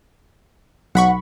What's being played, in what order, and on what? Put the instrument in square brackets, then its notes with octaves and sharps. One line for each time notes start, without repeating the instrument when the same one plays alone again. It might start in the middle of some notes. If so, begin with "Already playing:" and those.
[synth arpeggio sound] B1 B5 C#6 [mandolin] F#5